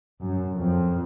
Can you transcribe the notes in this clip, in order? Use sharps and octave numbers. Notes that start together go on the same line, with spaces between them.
F#2
F2